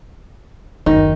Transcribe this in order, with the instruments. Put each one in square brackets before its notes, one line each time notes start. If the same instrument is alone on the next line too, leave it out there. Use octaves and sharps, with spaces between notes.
[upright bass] F#1 D#2 [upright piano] D#3 [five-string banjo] D#4